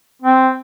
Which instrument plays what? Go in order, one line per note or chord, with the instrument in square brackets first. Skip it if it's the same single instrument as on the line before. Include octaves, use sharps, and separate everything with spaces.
[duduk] C4